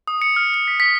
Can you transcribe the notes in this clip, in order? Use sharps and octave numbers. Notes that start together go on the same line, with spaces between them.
D#6
C#7
F6
C#7
B6
B6